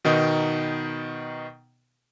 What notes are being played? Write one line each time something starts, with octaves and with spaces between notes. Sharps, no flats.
B2 D#3 B3 D#4